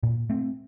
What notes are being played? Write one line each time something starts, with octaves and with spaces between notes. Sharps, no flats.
A#2
A3 C4